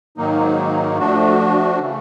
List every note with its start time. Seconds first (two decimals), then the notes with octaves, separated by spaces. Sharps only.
0.17 G#2 D#3 F#3 A#3 D#4
0.98 F3 A3 D4 F#4
1.79 C#3 E3 A3